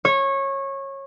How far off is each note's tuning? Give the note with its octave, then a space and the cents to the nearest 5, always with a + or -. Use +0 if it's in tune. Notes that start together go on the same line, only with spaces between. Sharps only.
C#5 -20